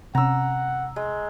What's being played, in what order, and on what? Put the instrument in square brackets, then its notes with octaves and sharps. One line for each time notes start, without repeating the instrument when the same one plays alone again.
[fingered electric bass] C3 C#4 [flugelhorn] F#5 [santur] A#5 E6
[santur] G#3